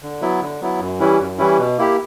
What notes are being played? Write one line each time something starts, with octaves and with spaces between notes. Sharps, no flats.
D3
F#3 B3 E4
D3
F#3 B3 E4
F#2
E3 G3 C#4 E4
F#2
E3 G3 C#4 E4
B2
A#3 E4 G4